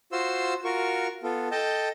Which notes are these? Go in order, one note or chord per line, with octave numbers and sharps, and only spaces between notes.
F4 F#4 C5 C6 E6
F4 F#4 A#4 C#6
B3 F4 A4
A4 D#5 G5 A5